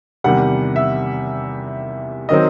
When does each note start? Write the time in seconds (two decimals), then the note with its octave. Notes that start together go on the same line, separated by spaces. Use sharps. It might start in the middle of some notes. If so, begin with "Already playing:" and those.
0.24 E2 C3 D#3 G3 F#5
0.76 E5
2.29 D#3 F#3 C4 D#5